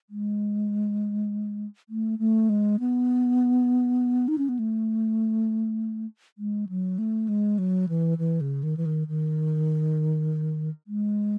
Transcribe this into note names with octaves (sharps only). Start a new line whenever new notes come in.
G#3
A3
A3
G#3
B3
D#4
C#4
B3
A3
G#3
F#3
A3
G#3
F#3
E3
E3
C#3
D#3
E3
D#3
D#3
G#3